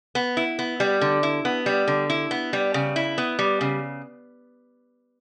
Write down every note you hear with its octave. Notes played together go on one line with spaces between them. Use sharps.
B3
E4
B3
G3
D3
E4
B3
G3
D3
E4
B3
G3
C#3
E4
B3
G3
C#3